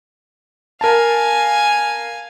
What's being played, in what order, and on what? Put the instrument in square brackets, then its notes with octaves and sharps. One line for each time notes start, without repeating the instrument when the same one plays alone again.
[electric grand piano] A#4 A5 [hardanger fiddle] F5 G#5